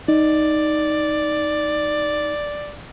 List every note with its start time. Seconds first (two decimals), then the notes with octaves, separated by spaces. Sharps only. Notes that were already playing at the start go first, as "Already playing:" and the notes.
0.08 D#4 D5